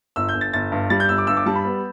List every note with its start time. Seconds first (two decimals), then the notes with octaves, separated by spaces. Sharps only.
0.16 G1 E6
0.29 G6
0.34 G1
0.41 A6
0.53 G1 A6
0.72 G2
0.90 G3 A6
1.00 G6
1.09 G1 E6
1.18 D6
1.27 G2 E6
1.37 D6
1.46 G3 A5
1.55 B5
1.65 B3